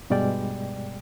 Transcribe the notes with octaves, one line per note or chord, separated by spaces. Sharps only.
G2 B2 G3 G#3 D5 G5